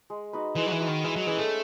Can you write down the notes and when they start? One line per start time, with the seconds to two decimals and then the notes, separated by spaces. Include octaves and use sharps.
0.10 G#3
0.33 D#4 F#4 B4
0.56 E3 G#3
0.67 F#3
0.72 E3
0.80 D#4 F#4 B4
0.88 D#3
1.04 E3 G#3
1.16 F#3
1.27 E3 C#4 G#4
1.38 A3